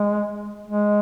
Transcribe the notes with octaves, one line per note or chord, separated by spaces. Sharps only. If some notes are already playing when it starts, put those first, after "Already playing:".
Already playing: G#3
G#3